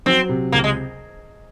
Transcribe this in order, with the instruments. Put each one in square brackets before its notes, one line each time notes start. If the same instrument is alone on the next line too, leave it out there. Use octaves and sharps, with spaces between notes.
[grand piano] F#3 [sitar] C4
[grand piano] C3
[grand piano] C#2 [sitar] A#3
[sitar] G#3